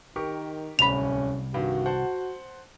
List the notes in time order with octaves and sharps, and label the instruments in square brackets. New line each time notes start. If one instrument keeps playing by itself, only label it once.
[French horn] D#3 [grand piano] G4 A#4 C#6
[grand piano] D1 [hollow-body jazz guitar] C2 B5 [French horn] C#4 [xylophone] F7
[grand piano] G2 D#3 [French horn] F#4
[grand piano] C5 F#5 A5